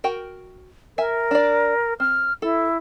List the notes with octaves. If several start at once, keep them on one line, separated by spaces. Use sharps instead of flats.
F#4 A#4 G5
A#4 E5 G#5
D4 D5
C4 F6
E4 A4